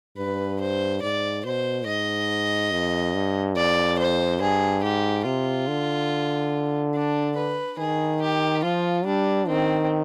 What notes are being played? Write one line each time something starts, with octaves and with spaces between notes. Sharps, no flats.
G2 B4
C5
G#2 D5
B2 C5
G#2 D#5
F2
G2
F2 D5
C5
G2 G#4
G#2 G4
C3 F4
D3
D4
B4
D#3 G#4
G4
F3 F4
G3 D4
D#3 C4